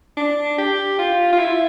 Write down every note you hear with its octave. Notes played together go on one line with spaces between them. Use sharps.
D4
G4
F4
F4
E4